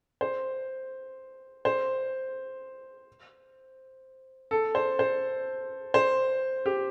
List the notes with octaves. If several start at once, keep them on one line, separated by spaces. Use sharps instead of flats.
C5
C5
A4
C5
C5
C5
G4